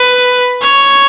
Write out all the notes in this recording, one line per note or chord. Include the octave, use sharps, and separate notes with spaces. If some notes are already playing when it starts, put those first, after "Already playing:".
Already playing: B4
C#5